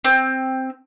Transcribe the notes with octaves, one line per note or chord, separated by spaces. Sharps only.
C4